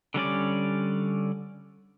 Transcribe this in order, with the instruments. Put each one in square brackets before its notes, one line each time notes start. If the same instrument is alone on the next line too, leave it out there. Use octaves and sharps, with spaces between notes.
[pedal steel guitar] D3 G3 C#4 D5